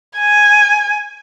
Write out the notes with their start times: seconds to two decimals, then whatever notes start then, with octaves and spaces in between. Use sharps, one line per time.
0.18 G#5